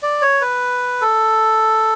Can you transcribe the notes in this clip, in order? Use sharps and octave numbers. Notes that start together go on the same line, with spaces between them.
D5
C#5
B4
A4